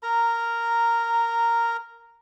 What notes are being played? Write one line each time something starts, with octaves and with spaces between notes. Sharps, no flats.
A#4 A#5